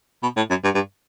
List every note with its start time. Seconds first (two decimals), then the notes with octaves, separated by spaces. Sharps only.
0.23 B2
0.37 A2
0.50 F#2
0.64 G2
0.74 G2